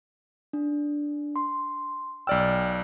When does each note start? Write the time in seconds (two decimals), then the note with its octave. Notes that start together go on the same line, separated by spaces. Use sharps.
0.53 D4
1.36 C6
2.27 B1 D5 G5 E6 F6